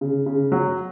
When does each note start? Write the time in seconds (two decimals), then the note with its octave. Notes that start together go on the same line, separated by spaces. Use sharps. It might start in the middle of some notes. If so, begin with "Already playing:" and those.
0.01 C#3
0.26 C#3
0.52 F#3